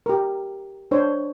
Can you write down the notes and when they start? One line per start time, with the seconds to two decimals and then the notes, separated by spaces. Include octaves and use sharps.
0.06 G4 A#4
0.91 D4 C5 C#5